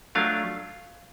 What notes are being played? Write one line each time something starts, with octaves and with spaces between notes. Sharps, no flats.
F#3 A3 D4 F4 F5